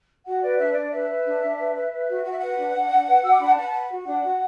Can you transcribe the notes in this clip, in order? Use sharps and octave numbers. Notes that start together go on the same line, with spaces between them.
F#4 F#5
B4 D5
D4 E5
D4 D5
B4 E5
B4
D4
D4
B4
B4
B4
F#4
F#4 F#5
E5
B4 F#5
D4
D4
D4
B4
F#4 E6
D6
D4 B5
A5
B4 F#5
A5
B4 F#5
F#4
D4 F#5
F#4